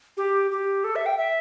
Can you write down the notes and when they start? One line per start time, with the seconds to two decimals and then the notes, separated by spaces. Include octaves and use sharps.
0.17 G4
0.51 G4
0.84 A4
0.96 E5
1.06 G5
1.17 E5